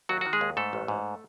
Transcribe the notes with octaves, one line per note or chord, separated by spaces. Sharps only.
D#2 F#3 F#4
D#3 F#4
G#3 G#4
D#2
G#2 A3 A4
A1
G#2